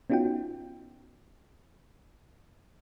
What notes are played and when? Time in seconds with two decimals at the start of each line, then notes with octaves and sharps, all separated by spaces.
0.10 B3 C#4 D#4 F4 F#4 G5